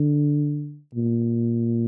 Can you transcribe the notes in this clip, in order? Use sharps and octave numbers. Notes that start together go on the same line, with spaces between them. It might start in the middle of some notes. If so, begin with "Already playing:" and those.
Already playing: D3
A#2